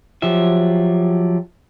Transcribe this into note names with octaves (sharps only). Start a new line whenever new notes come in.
F3 F#3 G4 E5